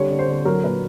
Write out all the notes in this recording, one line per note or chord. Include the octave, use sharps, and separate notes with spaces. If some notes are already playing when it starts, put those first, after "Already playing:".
Already playing: D3 G3 C#5
D3
C5
D3
F#3 A#4
A#2 B4